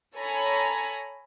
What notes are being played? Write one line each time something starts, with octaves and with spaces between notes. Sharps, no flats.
A4 C#5 G#5 A#5 B5